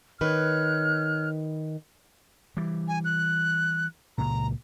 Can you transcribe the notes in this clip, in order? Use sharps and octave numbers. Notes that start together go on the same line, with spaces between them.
D#3 B4 C#5 F6 F#6
E3 G3
G#5
F#6
C#2 A#2 A#5